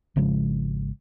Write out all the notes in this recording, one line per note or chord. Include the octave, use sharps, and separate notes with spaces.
G#1 C#3 F3 G#3